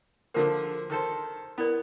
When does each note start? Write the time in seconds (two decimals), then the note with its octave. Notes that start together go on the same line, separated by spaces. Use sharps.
0.34 D3 F3 A#3 A#4 C5 F#5
0.63 G#4
0.90 D#3 A4 C5
1.58 B3 E4 A#4 D5